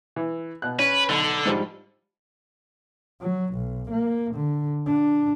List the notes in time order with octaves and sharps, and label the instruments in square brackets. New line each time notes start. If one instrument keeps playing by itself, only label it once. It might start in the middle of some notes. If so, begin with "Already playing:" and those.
[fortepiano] E3
B2 F#6
[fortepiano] C#4 [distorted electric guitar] B4
[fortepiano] B1 [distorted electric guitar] D3
[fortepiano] G#2 F3 G3
[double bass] F#3
B1
A#3
D3
D4